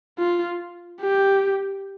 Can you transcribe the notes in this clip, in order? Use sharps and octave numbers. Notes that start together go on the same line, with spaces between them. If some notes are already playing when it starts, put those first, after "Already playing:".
F4
G4